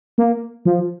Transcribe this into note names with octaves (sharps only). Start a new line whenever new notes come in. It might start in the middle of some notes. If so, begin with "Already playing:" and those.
A#3
F3